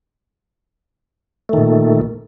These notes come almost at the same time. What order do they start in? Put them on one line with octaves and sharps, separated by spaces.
A3 D#3 A#2